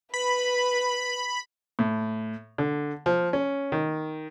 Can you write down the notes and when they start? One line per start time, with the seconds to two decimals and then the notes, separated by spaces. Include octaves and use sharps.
0.14 B4 B5
1.79 A2
2.58 D3
3.06 F3
3.33 C#4
3.72 D#3